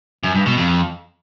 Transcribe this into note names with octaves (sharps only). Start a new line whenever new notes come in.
F#2
G2
B2
F2